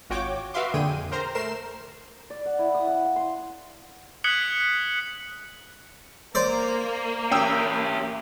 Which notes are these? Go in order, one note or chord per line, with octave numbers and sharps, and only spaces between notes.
G#1 F4 F#4 C#5 G5 D6
F#4 B4 E5 F5 C6 D6
F2 A#2 D3 G#4 G5 D#7
A#4 C5 A#5
A3 A#4 C5 C7 E7
D5
F#5
E4
D#6
F#5
F5
C6
D#6 F#6 G#6 B6 C#7 F#7
A#3 C5 D5
C#4 G4 G5 D#6 E6